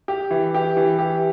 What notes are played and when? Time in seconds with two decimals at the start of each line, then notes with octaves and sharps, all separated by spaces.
0.08 G4
0.31 E3
0.54 G4
0.77 E3
0.99 G4